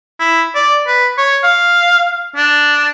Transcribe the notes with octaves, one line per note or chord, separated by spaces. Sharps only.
E4
D5
B4
C#5
F5
D4